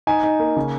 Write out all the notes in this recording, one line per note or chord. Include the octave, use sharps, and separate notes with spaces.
D#4 G#5
D#4
A#3
C#3